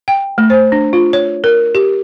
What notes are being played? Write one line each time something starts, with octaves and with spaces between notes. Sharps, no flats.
G5
A3
C5
D4
F4
C#5
A#4
G4